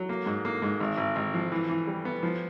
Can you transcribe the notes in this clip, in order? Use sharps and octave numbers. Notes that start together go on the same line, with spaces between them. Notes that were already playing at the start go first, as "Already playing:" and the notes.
Already playing: F#3
A#3
G#2
A#3
G#2
G#1
G#1
G#1
F3
E3
E3
G3
B3
F3